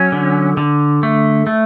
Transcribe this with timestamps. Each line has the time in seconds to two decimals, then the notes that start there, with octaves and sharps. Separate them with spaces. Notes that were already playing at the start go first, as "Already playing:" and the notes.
Already playing: F#3 C#4
0.12 D3
0.57 D3
1.03 A3
1.47 A3